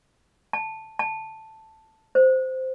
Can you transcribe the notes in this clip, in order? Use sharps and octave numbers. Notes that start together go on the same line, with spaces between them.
A5
A5
C5